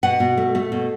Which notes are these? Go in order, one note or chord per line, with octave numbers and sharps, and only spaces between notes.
B2 F#5
B2
A3
A3
B2